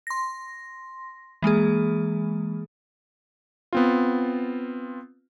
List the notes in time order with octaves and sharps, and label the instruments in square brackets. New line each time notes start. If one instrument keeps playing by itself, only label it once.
[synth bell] C6 A#6
E3 G#3 A#3 G#4
[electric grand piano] B3 C4 F4